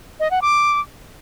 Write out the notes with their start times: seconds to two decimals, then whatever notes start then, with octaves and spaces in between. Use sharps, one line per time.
0.20 D#5
0.31 F#5
0.42 D6